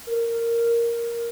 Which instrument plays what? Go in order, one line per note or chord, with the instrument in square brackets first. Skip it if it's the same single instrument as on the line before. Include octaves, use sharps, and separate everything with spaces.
[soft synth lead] A#4